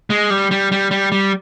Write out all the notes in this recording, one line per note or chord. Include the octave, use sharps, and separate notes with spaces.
G#3
G3
G3
G3
G3
G3